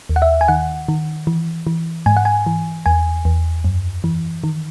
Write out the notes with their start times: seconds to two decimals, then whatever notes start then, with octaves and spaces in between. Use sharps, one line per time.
0.09 D#2
0.16 F#5
0.22 E5
0.41 G#5
0.48 D#3 F#5
0.88 D#3
1.27 E3
1.67 E3
2.06 G#2 G#5
2.17 F#5
2.25 G#5
2.46 E3
2.86 E2 G#5
3.25 E2
3.64 F#2
4.04 E3
4.44 D#3